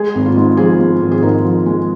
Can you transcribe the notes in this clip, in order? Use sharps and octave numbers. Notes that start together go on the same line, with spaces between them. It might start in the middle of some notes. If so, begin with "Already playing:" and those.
Already playing: G#3 G#4
G#1
F4
G#2
F3 G#4
G#3
G#1
G#4
G#2 A#4
F3
G#3